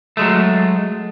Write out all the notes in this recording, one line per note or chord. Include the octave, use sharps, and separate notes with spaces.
F#3 G#3 A3